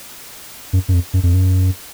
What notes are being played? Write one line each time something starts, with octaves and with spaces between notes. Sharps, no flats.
F#2
F#2
F2
F#2
F2
F#2